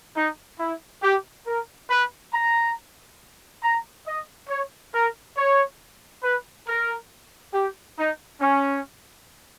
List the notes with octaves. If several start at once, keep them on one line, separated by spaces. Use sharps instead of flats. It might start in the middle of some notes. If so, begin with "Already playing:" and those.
D#4
E4
G4
A#4
B4
A#5
A#5
D#5
C#5
A#4
C#5
B4
A#4
G4
D#4
C#4